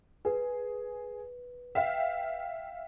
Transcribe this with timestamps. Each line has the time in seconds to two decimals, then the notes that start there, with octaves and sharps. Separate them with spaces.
0.25 G#4 B4
1.75 E5 F5 G5